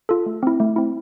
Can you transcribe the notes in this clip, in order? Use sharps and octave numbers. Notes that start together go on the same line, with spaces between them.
F4 A4
A3
C4 E4
A3
C4 E4